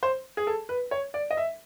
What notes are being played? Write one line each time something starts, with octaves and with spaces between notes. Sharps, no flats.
C5
G#4
A4
B4
C#5
D5
D#5
E5